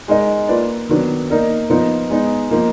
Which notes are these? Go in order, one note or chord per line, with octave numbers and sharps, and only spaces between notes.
G#3 D#4 A#4 D#5
A#3 F4 B4 D5
D#3 F#3 B3 D4
A#3 D#4 A#4 D5
F3 B3 D#4 A#4
G#3 B3 D#4
F3 A#3 D#4